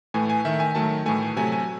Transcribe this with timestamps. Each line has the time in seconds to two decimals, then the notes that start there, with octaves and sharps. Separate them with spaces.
0.14 A2 E3 A3 G#5
0.30 G#5
0.45 D#3 A3 E5
0.60 G#5
0.75 D#3 F#3 A3 A5
1.06 A2 E3 A3 G#5
1.36 C3 F#3 A3 G#5
1.52 G#5